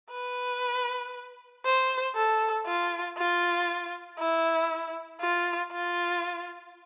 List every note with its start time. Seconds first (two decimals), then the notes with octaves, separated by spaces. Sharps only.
0.11 B4
1.65 C5
2.15 A4
2.66 F4
3.18 F4
4.19 E4
5.21 F4
5.72 F4